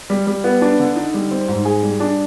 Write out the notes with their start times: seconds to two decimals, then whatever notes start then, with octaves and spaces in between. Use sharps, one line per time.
0.10 G3
0.27 G3
0.44 B3
0.61 D4
0.79 D3
0.96 D#4
1.14 G3
1.31 C4
1.48 G#2
1.65 G#4
1.83 G3
2.00 D4